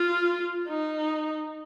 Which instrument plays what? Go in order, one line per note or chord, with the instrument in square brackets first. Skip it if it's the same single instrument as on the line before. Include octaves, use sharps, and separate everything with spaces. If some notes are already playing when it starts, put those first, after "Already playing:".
Already playing: [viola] F4
D#4